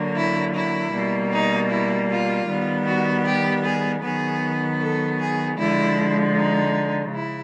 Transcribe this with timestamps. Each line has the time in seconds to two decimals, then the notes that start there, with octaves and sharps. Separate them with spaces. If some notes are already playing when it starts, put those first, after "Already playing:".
Already playing: D3 F#3 A#3
0.15 E4
0.54 E4
0.92 B2 G3 A#3
1.31 D#4
1.70 E4
2.09 F4
2.48 D#3 G3 B3
2.86 F#4
3.25 G4
3.63 G#4
4.03 D#3 F#3 B3 G#4
4.80 A4
5.19 G#4
5.57 D3 F3 G#3 E4
6.35 D#4
7.12 C#3 E4